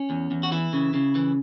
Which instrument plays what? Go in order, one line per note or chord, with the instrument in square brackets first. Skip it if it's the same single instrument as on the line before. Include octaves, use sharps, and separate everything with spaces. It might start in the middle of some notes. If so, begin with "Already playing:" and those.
Already playing: [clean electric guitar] C#4
E2
E2
F#4
E3 E4
C#3
C#3
E3